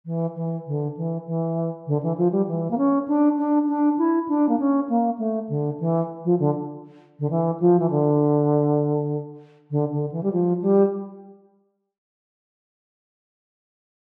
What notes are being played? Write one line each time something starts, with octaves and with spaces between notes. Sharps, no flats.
E3
E3
D3
E3
E3
D3
E3
F3
G3
E3
A#3
C#4
D4
D4
D4
E4
D4
A#3
C#4
A#3
A3
D3
E3
F3
D3
D3
E3
F3
E3
D3
D3
D3
E3
G3
F3
G3